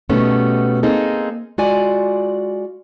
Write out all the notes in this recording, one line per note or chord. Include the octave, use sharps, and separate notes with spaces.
B2 G3 A3 B3 C#4 D#4
A#3 C4 D#4 G#4 A4
G#3 F4 F#4 D5 G#5